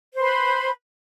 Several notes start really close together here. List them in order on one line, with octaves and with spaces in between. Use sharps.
C5 B4 B5